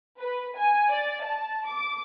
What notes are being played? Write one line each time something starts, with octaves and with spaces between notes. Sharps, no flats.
B4
G#5
D5
A5
D6